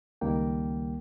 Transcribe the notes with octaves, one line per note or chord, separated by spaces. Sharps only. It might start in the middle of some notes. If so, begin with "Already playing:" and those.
C#2 D#3 G3 A#3 G5